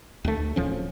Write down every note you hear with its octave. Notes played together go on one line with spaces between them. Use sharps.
D2 A3
D1 F3 C#4